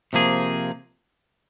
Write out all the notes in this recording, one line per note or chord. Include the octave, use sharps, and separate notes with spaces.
C3 F3 A#3 G#4